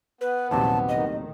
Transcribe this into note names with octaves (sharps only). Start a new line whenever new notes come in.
B3 B4
A#1 D#2 C3 E3 F#3 G3 A5
A2 D#3 D#5